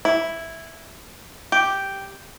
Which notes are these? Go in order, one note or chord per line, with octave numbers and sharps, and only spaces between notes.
E4
G4